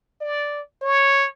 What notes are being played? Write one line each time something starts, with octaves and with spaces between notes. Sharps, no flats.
D5
C#5